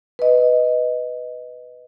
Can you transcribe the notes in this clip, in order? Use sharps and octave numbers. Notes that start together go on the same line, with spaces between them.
B4 D#5